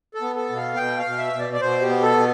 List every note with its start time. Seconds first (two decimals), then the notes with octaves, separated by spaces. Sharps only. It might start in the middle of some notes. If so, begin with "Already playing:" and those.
0.15 A4
0.21 B3
0.36 A4
0.50 B2
0.57 F5
0.77 B2 G5
0.99 F5
1.06 B2
1.19 E5
1.33 B2
1.39 D5
1.53 D5
1.61 B2 C5
1.82 G4
1.89 B3
2.03 A4
2.17 B2